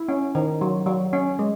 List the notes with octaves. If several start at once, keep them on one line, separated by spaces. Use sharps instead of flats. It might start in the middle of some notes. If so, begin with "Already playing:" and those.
Already playing: E4
C#4
D#3
F#3
F#3
C#4
G#3